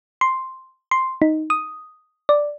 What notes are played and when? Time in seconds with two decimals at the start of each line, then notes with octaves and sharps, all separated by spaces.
0.21 C6
0.91 C6
1.22 D#4
1.50 D#6
2.29 D5